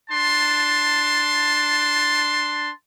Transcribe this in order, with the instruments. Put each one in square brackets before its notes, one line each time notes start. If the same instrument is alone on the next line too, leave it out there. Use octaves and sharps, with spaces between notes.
[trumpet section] D4 A5 C6